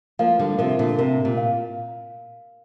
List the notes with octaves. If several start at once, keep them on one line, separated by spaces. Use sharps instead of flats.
F3 A#3 F5
D3 G3
C3 F3 A#4
A#2 D3
C3 A#4
A#2
F5